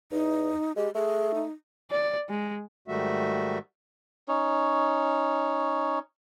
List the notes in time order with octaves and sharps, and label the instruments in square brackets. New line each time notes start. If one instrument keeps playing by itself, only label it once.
[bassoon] E2 [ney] D#4
[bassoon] G#3 [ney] G4
[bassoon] A3 [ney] G#4
[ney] D#4
[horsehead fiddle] D5
G#3
[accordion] G#2 D#3 G3 A3 F#4 E5
[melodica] C#4 D#4 C#5